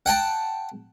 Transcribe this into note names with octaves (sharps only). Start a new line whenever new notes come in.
F#5 G5 A5